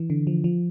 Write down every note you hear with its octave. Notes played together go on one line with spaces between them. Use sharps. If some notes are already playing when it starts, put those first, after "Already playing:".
Already playing: E3
D3
F3
F3